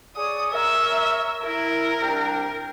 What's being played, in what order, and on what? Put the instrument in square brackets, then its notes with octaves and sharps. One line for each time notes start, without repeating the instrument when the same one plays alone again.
[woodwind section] G#4 C#5 D5 [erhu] D#6
[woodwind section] A#4 C#5 A#5 [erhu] E5
[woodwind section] E4 [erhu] A#4
[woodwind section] C2 D4 G5